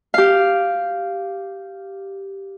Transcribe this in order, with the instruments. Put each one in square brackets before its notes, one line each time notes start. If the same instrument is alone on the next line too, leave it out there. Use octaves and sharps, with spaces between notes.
[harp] G4 F5